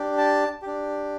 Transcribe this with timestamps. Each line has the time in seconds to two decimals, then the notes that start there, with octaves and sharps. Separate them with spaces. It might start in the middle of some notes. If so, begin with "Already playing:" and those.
Already playing: D4 G4
0.18 A5
0.62 D4 G4